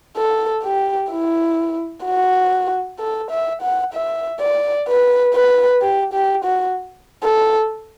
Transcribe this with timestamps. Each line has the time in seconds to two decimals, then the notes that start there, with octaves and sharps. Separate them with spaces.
0.17 A4
0.64 G4
1.11 E4
2.05 F#4
2.99 A4
3.31 E5
3.62 F#5
3.94 E5
4.41 D5
4.88 B4
5.35 B4
5.82 G4
6.13 G4
6.44 F#4
7.23 A4